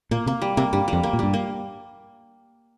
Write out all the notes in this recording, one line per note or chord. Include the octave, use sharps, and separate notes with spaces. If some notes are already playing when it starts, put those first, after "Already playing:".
A#2 A#3
C3 A#3
G3
C3 A#3
G2 G3
G3
F2
A#3
A#2
G2 G3
A#3